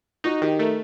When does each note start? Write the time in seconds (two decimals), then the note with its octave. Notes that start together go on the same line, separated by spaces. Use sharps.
0.24 D#4 F#4
0.42 D#3 G4
0.59 A3 A#4